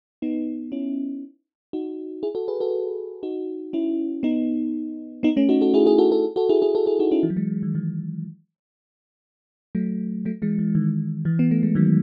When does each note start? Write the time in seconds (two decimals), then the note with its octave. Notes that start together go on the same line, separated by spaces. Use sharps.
0.22 B3 D#4
0.72 C#4 E4
1.73 D#4 F#4
2.23 E4 G#4
2.35 F#4 A4
2.48 G#4 B4
2.60 F#4 A4
3.23 D#4 F#4
3.73 C#4 E4
4.23 B3 D#4
5.23 B3 D#4
5.36 A3 C#4
5.49 D#4 F#4
5.61 F#4 A4
5.74 E4 G#4
5.86 E4 G#4
5.98 F#4 A4
6.11 F#4 A4
6.36 F#4 A4
6.49 E4 G#4
6.62 E4 G#4
6.75 F#4 A4
6.86 E4 G#4
6.99 D#4 F#4
7.11 C#4 E4
7.23 E3
7.30 F#3
7.36 E3 G#3
7.63 D#3
7.75 E3
9.75 F#3 A3
10.25 F#3 A3
10.42 E3 G#3
10.59 E3
10.75 D#3
11.25 E3
11.39 B3
11.51 A3
11.63 G#3
11.75 D#3 F#3